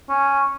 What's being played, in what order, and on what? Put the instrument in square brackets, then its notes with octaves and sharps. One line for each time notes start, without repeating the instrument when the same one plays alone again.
[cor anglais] C#4